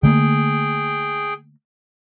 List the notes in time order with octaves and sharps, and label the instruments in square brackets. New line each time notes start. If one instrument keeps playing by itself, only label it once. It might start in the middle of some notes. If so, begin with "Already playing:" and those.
[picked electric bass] D3 A3 A#3 [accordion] G#4 G5